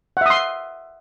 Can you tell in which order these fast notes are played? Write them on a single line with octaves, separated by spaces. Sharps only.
F#5 E5 D#6 C6